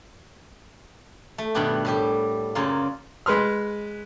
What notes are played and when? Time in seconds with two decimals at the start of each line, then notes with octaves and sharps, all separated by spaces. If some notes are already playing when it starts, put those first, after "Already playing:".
1.38 A3
1.54 G2 B2 D#3 B3 D4 G4
1.85 A2 G3 G4
2.55 F#2 C#3 A#3 F4
3.26 G#3 B4 C6 F6